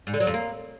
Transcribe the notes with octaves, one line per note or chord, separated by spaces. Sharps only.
G#2
D3
F#3
F2
A#3